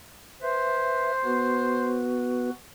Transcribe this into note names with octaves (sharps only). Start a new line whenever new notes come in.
B4 C5 E5
B3 F#4 B4